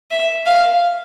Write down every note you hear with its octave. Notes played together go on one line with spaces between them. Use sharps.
E5
F5